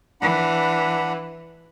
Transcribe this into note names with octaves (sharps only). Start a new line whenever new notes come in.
E3 D4 F#5 B5